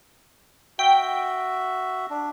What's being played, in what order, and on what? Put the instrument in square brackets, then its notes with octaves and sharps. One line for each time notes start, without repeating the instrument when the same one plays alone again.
[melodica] F#4 E5 [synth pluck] G5
[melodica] D4